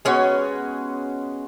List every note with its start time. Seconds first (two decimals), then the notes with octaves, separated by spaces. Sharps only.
0.05 G#3 B3 C#4 F#4 G#4